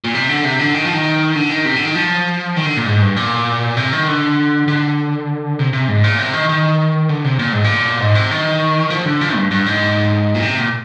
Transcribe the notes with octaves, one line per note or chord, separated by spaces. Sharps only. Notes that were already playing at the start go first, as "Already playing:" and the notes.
A#2
C3
D3
C3
D3
D#3
F3
D#3
D3
D#3
C3
D3
D#3
F3
D#3
D3
A#2
G#2
G2
A#2
C3
D#3
D3
D3
C3
C3
G#2
A#2
C3
D#3
D#3
D3
C3
A#2
G#2
A#2
G#2
C3
D#3
F3
D3
F3
G2
G2
G#2
A#2
C3
A#2